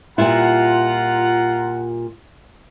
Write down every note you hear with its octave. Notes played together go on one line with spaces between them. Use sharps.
A#2 G3 E4 F4 F#5 A#5